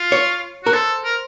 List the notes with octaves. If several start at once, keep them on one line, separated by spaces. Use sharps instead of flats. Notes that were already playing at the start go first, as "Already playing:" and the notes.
Already playing: F4
C#5
F#4 A#4
A4 C5
A#4